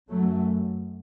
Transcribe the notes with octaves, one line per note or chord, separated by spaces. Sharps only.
F#2 F#3 A3